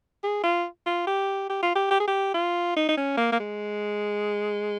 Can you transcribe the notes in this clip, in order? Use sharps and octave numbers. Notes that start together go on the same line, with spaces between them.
G#4
F4
F4
G4
G4
F4
G4
G4
G#4
G4
F4
D#4
D#4
C#4
A#3
A#3
G#3